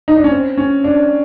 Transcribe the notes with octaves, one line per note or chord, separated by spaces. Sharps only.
D#4
D4
C#4
C4
C#4
D4